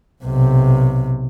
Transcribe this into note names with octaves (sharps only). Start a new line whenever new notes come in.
B1 C3